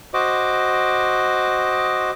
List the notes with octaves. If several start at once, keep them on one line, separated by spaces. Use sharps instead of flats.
F#4 C5 D#5 D6